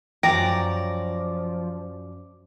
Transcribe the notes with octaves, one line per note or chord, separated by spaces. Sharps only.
F#2 F3 D5 G5 A#5